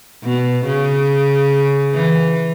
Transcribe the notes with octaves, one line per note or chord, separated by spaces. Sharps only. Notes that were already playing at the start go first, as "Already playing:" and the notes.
B2
C#3
E3